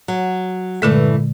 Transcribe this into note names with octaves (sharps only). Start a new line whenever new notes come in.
F#3
G2 A#2 D3 E3 G#3 A3